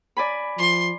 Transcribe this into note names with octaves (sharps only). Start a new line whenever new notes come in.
D5 G#5 B5
F3 C6